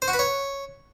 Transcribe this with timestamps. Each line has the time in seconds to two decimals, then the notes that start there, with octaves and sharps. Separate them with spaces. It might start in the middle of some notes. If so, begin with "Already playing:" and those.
0.02 C5
0.08 F#4
0.13 B4
0.19 C#5